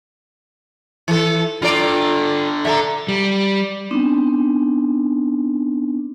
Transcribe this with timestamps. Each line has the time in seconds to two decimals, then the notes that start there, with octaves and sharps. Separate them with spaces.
1.08 E3 A4
1.62 D3 F4 A4 D5 A#5
2.65 D3 A4 E5 A#5
3.08 G3
3.91 B3 C4 D4 D#4